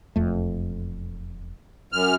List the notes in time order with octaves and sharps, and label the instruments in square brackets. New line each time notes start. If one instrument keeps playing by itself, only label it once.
[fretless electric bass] E1 F2 A3
[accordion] F#2 F6